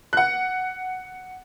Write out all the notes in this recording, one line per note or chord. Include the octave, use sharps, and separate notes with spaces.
F#5 F#6